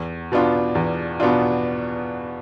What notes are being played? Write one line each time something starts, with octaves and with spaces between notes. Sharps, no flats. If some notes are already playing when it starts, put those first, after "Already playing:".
Already playing: E2
B2 B3 D4 F4
E2
B2 B3 D4 F4